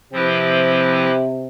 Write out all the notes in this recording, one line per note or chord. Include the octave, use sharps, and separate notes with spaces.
C3 F3 C4 E4 G4 B4